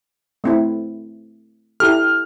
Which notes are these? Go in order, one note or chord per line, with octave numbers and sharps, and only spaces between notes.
A3 C4 E4
E4 G4 A4 F6